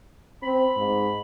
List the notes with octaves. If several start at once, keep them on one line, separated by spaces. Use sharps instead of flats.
C4 B5
G#2